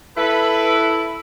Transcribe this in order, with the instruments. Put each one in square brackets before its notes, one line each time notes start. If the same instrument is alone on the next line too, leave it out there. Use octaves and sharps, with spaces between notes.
[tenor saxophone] E4 [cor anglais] A4 [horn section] B4